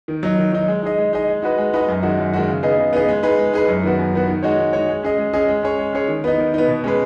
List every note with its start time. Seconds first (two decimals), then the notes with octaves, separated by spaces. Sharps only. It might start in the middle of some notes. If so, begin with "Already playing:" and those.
0.08 D#3
0.23 F#3 D#4
0.37 D#3
0.52 F#3 D#4
0.68 G#3
0.83 D#4 G#4 D#5
0.98 G#3
1.13 D#4 G#4 D#5
1.28 G#3
1.42 D#4 F#4 B4 D#5
1.58 G#3
1.73 D#4 F#4 B4 D#5
1.88 F#2
2.03 D#3 G#3 D#4 F#4
2.18 F#2
2.33 D#3 G#3 D#4 F#4
2.48 C#3
2.63 B3 D#4 G#4 D#5
2.78 C#3
2.93 B3 D#4 G#4 D#5
3.08 G#3
3.23 D#4 G#4 B4
3.38 G#3
3.53 D#4 G#4 B4
3.68 F#2
3.83 D#3 B3 F#4
3.99 F#2
4.13 D#3 B3 F#4
4.28 D#3
4.43 G#3 D#4 F#4 C#5
4.58 D#3
4.73 G#3 D#4 F#4 C#5
4.88 G#3
5.03 C#4 G#4 D#5
5.18 G#3
5.33 C#4 G#4 D#5
5.48 G#3
5.63 C#4 G#4 C#5
5.79 G#3
5.93 C#4 G#4 C#5
6.08 D#3
6.24 B3 D#4
6.38 D#3
6.54 B3 D#4
6.68 B2
6.84 G#3 C#4 G#4 B4